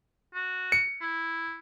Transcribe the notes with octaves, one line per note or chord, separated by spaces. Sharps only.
F#4
C#7
E4